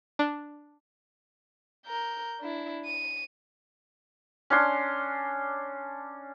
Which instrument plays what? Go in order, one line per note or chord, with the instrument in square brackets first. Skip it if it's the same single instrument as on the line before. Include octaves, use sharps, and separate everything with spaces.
[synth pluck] D4
[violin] A#4 G6
D4 E4
D#7
[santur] C#4 D4 C6